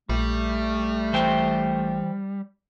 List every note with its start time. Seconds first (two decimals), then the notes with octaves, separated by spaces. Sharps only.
0.09 A#1 G3 A3
1.13 E3 C5 G5